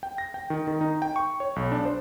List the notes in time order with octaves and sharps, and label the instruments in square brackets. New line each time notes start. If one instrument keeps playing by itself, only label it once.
[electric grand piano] G5
A#6
G5
D#3
D#3
D#4
G5
C#6
C#5
B1
D4
C5